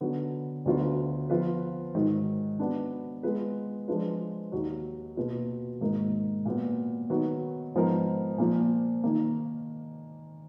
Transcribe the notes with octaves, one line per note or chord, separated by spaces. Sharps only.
D3 F#3 B3
D2 D3 F#3 B3 F4
F3 B3 F4 B4
G#2 D#3 F#3
F#3 B3 D4
G#3 B3 F4 B4
F3 G#3 D4 F4 B4
D#2 D#3 F#3
B2 A#3 F4 B4
G#2 D#3 A#3 D#4 A#4
A#2 F#3 B3
D#3 F#3 B3
G#2 F3 B3 D#4 A#4
A#2 F3 A#3
D#3 A#3